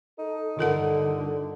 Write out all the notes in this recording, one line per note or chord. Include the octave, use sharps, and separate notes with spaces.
D#4 A4
G2 D3 F4 A4 A#4 F#5